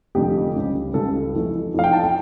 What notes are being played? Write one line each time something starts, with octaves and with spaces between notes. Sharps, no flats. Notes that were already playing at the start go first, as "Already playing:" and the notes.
F1 F2 D3 G3 G4
C#2 C#3 G3
C#2 C#3 G3 A4
F2 E3 A3
F2 E3 A3 F5
G5
A5
G5